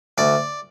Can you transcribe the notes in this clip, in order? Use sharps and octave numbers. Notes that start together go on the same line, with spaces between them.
D2 D5